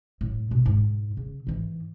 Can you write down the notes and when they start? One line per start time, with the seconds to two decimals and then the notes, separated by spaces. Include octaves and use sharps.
0.21 A2 F#3
0.51 B2
0.66 G#2 E4
1.17 C#3
1.47 G#2 E3